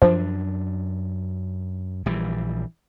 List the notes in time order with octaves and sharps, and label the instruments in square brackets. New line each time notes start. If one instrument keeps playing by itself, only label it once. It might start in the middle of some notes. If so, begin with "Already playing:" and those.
[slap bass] F#2 D4 [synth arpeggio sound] F3
[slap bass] A#1 E3 G3